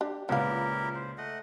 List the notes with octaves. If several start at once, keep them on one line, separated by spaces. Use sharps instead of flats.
D4 G4
C#2 A#2 B3 E4 G4 A#4 B4 F5
C5
A3 D#5 F#5